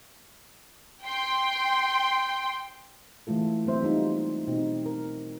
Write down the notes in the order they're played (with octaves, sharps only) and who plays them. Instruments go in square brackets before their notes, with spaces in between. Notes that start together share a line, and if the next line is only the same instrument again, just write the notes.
[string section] G5 C6
[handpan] E3 G#3 A3 F4 A4
F#3 A#3 C4 C5 E5
G3 D#4 F4
B2 C4 D#4
A#4